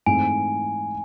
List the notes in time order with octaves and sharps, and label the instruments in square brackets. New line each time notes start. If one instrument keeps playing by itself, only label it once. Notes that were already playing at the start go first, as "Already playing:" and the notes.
[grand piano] G#2 E3 A3 C4 [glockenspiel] G#5